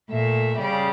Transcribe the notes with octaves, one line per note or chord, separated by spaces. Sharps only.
A#2 A3 E5
C#3 G3 D5